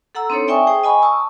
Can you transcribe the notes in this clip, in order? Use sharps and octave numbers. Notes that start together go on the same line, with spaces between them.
A4 F#5 A#5 E6
C4 D4 D#4 A4 C5 C#5
D5 E5 G5 G#5 C#6 D#6
G#4 C5 G5 D#6
D#5 G#5 B5 C#6
A5 C#6 D#6 E6